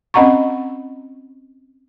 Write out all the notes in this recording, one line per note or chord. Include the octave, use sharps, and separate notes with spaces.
C4 C#4 D#5 F#5 A#5 C#6